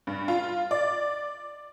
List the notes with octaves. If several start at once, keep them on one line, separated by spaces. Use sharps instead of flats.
G2
F4
D5